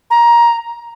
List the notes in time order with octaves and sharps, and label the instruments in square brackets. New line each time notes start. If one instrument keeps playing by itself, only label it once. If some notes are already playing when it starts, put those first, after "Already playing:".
[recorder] A#5